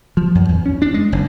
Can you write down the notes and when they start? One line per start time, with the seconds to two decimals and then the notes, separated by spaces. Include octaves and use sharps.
0.17 F3
0.35 F#2
0.49 E2
0.66 C#4
0.82 D4
0.94 G#3
1.12 F#1